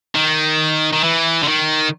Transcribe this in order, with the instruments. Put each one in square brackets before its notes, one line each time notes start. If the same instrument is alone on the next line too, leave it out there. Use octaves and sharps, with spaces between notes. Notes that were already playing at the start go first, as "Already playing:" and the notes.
[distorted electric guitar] D#3
D#3
E3
D3
D#3